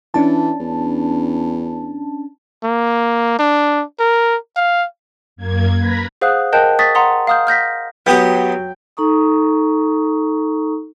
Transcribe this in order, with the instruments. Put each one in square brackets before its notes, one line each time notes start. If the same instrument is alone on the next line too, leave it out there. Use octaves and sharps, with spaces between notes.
[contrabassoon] E3 [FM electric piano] C#4 D4 A5
[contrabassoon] E2
[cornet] A#3
D4
A#4
F5
[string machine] F#2 A#3 G#6
A#4 B4 A#5 B5
[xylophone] G#4 C5 F5 F#5 D#6 F#6
A#4 D#5 G5 A5 F#6 G6
C#6 D#6 A6 B6
F#5 A#5 C6 D#6
F5 A#5 D#6 F6 G6
F6 G6 A#6 B6
[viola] F#3 [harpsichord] B3 G4 D#6 [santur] G5
[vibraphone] D#4 A4 A#5 C#6 D#6